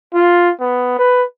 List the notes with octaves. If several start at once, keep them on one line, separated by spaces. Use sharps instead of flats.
F4
B3
B4